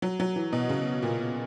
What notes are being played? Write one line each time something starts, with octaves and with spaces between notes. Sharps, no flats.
F#3
F#3
E3
B2
C#3
A#2